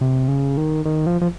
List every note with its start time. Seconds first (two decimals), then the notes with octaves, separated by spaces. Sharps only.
0.01 C3
0.28 C#3
0.57 D#3
0.85 D#3
1.07 F3
1.21 F3